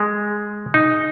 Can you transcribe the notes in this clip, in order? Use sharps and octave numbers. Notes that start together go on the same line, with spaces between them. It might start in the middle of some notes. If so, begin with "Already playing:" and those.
Already playing: G#3
D#4